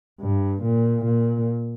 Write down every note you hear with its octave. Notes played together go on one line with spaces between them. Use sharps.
G2
A#2
A#2